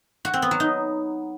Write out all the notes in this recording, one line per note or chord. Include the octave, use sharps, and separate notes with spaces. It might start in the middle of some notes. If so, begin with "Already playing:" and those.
F#4
C4
B3
F#3
D#4